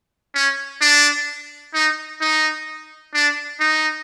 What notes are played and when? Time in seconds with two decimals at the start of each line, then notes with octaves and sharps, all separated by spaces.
0.34 C#4
0.81 D4
1.74 D#4
2.21 D#4
3.14 D4
3.60 D#4